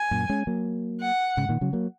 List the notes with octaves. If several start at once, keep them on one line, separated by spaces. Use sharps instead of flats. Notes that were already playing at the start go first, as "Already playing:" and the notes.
Already playing: G#5
F#2 A#2
G#3 C#4
F#3 A#3
F#5
G#2 C#3
A#2 D#3
C#3 F#3
F#3 A#3